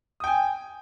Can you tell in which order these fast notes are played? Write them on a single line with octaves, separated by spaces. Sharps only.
D#6 G5 G#5